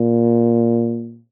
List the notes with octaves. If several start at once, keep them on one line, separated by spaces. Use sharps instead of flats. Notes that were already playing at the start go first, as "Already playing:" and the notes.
Already playing: A#2